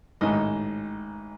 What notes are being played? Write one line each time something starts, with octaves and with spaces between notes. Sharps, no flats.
A1 G#2 D#3 D#5